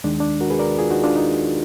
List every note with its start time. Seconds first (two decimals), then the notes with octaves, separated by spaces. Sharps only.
0.04 D#2 D#3 G#3 D4
0.20 D4
0.41 F#4 A#4
0.50 G#4 B4
0.59 A#4 D5
0.79 F4 G#4
0.91 D#4 F#4
1.04 D4 F4
1.16 D#4